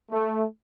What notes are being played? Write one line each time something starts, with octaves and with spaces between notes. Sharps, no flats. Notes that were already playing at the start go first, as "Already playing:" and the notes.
A3